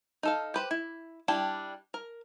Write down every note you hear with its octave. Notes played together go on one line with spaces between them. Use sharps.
D#4 A4 F5
G4 B4 C5
E4
G3 D4 E4 G5 A5
A#4